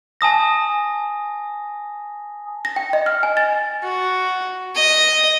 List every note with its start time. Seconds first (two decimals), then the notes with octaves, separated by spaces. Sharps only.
0.21 G#5 A5 D#6 A#6
2.65 A#6
2.76 G5
2.93 D#5
3.06 F6
3.23 G#5
3.37 A6
3.83 F#4
4.75 D#5